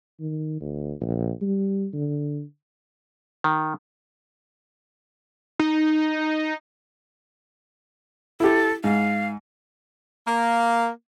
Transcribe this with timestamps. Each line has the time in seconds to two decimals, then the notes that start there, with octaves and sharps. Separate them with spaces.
0.20 D#3
0.61 D2
1.01 A#1
1.42 G3
1.94 D3
3.44 D#3
5.59 D#4
8.40 E4 G4 A4
8.84 G#2 F5
10.27 A#3